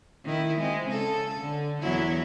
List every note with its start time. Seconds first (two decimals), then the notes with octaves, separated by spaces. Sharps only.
0.24 D#3 E4
0.58 G#3 C4
0.87 C#3 A4
1.40 D3
1.81 E2 F#3 E4